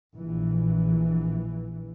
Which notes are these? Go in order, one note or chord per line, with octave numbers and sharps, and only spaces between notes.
A#1 E3